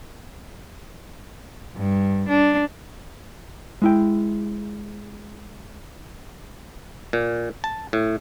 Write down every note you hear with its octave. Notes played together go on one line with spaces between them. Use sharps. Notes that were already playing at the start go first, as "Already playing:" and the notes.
G2
D4
G#3 E4 G5
A#2
A5
A2